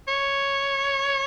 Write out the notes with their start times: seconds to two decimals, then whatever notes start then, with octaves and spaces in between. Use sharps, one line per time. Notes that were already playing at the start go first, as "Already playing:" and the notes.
0.08 C#5